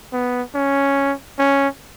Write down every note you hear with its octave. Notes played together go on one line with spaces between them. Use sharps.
B3
C#4
C#4